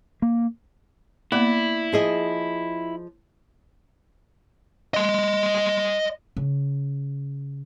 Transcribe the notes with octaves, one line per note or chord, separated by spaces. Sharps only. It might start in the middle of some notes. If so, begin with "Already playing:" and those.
A#3
A#3 B3 E4 D5
F3 G#4 D#5
D#5 C6
C#3